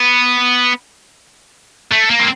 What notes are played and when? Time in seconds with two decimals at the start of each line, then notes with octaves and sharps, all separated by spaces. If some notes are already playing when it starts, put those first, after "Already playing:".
Already playing: B3
1.92 A3
2.10 A#3
2.20 C4